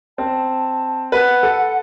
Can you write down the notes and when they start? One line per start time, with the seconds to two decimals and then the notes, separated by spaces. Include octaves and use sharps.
0.18 C4 A5
1.12 B4 F#5
1.43 A4